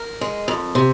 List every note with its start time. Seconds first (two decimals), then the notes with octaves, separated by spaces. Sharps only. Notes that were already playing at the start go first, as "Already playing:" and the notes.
Already playing: A#4
0.21 G#3
0.48 F2
0.75 C3